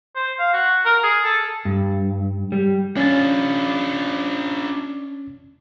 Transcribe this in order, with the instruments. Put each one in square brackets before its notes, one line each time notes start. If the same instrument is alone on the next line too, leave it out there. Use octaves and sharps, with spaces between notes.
[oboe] C5
F5
F#4
A#4
G#4
A4
[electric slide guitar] G2
G3
[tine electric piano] C#4 A6 [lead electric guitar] D4 F4